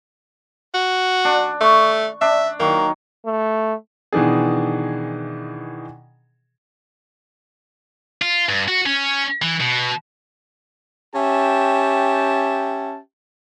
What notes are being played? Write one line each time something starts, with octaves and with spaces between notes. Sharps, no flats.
F#4
D4
A3 C#6
D4 E5
D#3 F#3 A#3
A3
B2 D#3 E3 D4 G#4
F4
G2
F#4
C#4
E3
B2
C#4 G4 E5 G5 A5